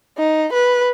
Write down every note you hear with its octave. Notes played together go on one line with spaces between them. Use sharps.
D#4
B4